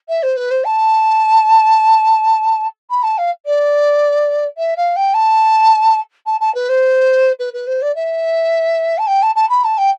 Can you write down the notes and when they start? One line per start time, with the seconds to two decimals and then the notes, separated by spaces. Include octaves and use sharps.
0.08 E5
0.22 C5
0.36 B4
0.50 C5
0.64 A5
2.90 B5
3.03 A5
3.17 F5
3.45 D5
4.57 E5
4.76 F5
4.96 G5
5.13 A5
6.26 A5
6.40 A5
6.54 B4
6.69 C5
7.39 B4
7.53 B4
7.67 C5
7.81 D5
7.95 E5
8.98 A5
9.07 G5
9.22 A5
9.35 A5
9.49 B5
9.64 A5
9.77 G5